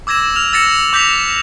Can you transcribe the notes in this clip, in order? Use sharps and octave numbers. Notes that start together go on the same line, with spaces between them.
D6 E6 G#6 A#6 E7
F6 F7
E6 A6 A#6 C#7 E7
D6 G6 A#6 B6 F7